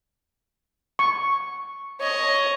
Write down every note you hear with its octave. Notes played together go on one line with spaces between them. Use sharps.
C#6
C#5 D#5